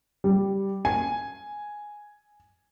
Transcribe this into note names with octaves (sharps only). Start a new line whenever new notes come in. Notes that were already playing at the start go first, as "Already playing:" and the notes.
G3
G#5